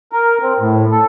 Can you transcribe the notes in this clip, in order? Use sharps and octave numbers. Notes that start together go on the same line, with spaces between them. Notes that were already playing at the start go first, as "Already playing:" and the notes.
A#4
C4
A2
A4